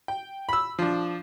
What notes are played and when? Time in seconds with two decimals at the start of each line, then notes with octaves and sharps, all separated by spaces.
0.08 G5
0.49 B5 E6
0.79 F3 D4